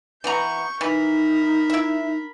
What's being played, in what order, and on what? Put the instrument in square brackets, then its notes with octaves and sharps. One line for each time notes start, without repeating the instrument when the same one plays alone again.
[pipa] E3 B3 A#5 [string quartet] C#6 G6
[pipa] E3 [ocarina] D#4 [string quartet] A#4 B5
[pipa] E4 E5